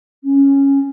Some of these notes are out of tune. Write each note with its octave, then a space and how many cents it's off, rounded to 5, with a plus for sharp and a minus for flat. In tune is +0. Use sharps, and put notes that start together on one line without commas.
C#4 -5